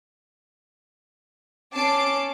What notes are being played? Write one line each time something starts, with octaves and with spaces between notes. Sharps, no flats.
C#4 A5 D6 C7 D7